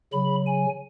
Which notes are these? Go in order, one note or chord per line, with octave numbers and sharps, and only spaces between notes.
C#3 F#3 B5
G#5